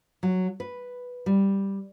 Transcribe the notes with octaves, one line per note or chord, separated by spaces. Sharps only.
F#3
B4
G3